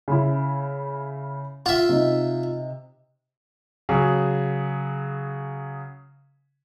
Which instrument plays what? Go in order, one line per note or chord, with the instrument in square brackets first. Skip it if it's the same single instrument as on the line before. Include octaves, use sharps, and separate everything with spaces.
[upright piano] C#3 E4
[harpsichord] F4 E5 [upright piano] F5
[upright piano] C3 D#4
[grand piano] C#3 F#3 G#4